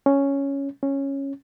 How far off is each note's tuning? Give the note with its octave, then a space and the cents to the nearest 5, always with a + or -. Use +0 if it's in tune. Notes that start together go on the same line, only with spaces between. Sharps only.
C#4 +0
C#4 -10